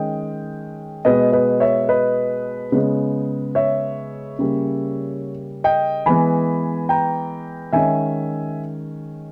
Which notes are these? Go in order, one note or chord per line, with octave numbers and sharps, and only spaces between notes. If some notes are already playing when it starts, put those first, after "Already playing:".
Already playing: D#3 G#3 C#4 D#5 G5
B2 G#3 B3 B4 D#5
B4 D#5
C#5 E5
B4 D#5
C#3 G#3 B3
C#5 E5
C#3 G3 A#3 C#4
D#5 G5
E3 G#3 B3 G#5 B5
G5 A#5
D#3 G#3 C#4 E5 G#5